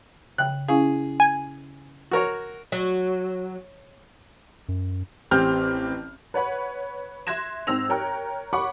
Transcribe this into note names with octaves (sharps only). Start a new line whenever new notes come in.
C#3 G5 F#6
C#4 E4 G#4 F5
G#5
F#4 A#4 C#5
F#3
F#2
A1 C4 G4 F6 G6
B4 C#5 F#5 B5
E5 C6 F#6 G#6 A#6 E7
G#2 C4 C5 E6 A#6 F7
A#4 C#5 G5 A#5 F6 F#6
C#5 F#5 B5 C#6 D6